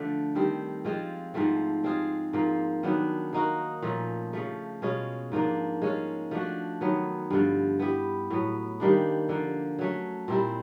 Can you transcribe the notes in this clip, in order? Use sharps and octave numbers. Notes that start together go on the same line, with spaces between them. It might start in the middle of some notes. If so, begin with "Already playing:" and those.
Already playing: D3 F3 A3
D#3 G3 C4
F3 G#3 C4 F4
G#2 F3 A3 C4
G#3 C4 F4 G#4
G#2 F3 A#3
D#3 F#3 B3 D4
A#3 D#4 F#4 A#4
A#2 F3 A3 C#4
C#3 F3 A3
B2 G#3 C#4 F4
G#2 F3 A#3 D4
G#3 C#4 F4
F3 A3 D4 F#4
D#3 F#3 B3
G2 D3 F3
B3 E4 G4
A2 F#3 B3
D#3 G3 A#3 D4
D3 F3 A#3
F#3 A3 C#4
A#2 G3 C4 E4